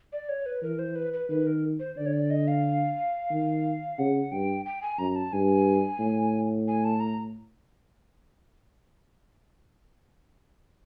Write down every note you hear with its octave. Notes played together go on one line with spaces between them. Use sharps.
D5
C#5
B4
E3 A#4
C5
B4
B4
D#3 B4
A#4
C5
D3 D5
C#5
D5
D#5
F5
D#3
C#3 F#5
G2 G5
G5
G#5
F#2 A#5
A5
G2 G#5
A2
G#5
A5
A#5